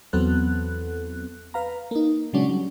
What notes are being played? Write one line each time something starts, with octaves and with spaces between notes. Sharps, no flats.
E2 F#3 B3 C4 A4 F#6
B4 F5 A#5
A#3 D#4
A#2 C#3 F#3 G#3 C#4 D4
F#3 G3 C#4